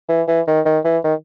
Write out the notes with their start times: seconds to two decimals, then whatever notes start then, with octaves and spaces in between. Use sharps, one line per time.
0.09 E3
0.27 E3
0.47 D#3
0.65 D#3
0.84 E3
1.04 D#3